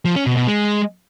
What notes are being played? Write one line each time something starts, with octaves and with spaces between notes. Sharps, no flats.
F3
C#4
B2
B2
G#3